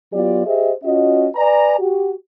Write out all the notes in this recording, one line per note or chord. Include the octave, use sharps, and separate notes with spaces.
F#3 B3 F4 G4 D5
G4 G#4 C5 D#5 E5
C#4 F4 F#4 D#5
B4 D5 G#5 A#5
F#4 G4